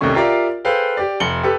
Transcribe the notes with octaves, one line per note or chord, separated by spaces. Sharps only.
C2 C3 D#3 A3 C#4 C#6
F4 G4 A#4 D5 E5 F5
G#4 A4 B4 C5 F5 G5
G4 D5
F1 C#7 F#7 G7
G4 A4 B4